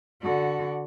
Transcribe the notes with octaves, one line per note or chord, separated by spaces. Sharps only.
D3 F#4